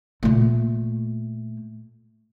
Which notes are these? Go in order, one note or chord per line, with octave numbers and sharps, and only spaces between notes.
A#2 A3